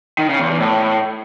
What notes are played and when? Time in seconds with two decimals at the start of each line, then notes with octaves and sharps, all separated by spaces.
0.19 D#3
0.29 C#3
0.39 E2
0.50 E2
0.60 A2